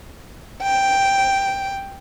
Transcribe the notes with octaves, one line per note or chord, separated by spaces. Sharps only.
G5